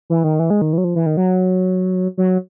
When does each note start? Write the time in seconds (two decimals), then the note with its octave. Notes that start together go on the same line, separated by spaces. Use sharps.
0.10 E3
0.24 D#3
0.39 E3
0.50 G#3
0.62 D#3
0.73 E3
0.78 F#3
0.84 F3
0.95 E3
1.06 D#3
1.17 F#3
2.18 F#3